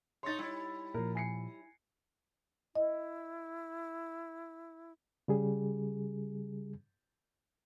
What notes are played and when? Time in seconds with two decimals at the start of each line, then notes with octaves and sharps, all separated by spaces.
0.23 D#4 C#5 C6 A6
0.38 G3 E4
0.94 A#2 F3 A#4
1.15 G#5 C7 C#7
2.75 E4 D#5
5.28 C#3 G3 G#4